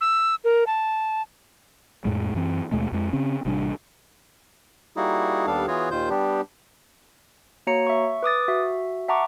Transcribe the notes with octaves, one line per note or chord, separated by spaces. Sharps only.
E6
A#4
A5
F2 A2 G#3
F#2 E3 C4
D#2 B2 G#3 A3
F2 G#3
C#3 C4 C#4
A1 C3 G3 D4
G3 A#3 D#4 E4 F#4 G#4
D#2 G3 B3 D4 A4 F5
E3 B3 F4 F#4 G#4 C#5
D#2 A#2 D#3 F4 C5 G6
G3 B3 D4 G4
A#3 F#4 C#5 A#5 C#7
E5 C#6
B4 D6 D#6 A6
F#4 E5
E5 F#5 A5 A#5 C#6 D6